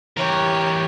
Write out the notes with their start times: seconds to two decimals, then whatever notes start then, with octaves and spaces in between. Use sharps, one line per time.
0.17 E3 G4 A#4 C#5